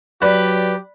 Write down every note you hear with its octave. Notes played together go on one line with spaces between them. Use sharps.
F#3 G4 B4 D5